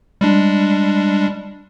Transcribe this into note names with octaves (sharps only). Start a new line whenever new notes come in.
G3 G#3 D4